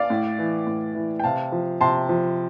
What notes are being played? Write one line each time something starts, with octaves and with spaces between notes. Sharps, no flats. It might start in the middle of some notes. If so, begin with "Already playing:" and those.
Already playing: D5 F5
A2
E3
A2
E3
G5
C3 F5 A5
F3
C3 A5 C6
F3